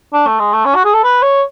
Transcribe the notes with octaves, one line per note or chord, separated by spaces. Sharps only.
D4
A3
G#3
A3
C#4
F#4
G#4
A4
B4
C#5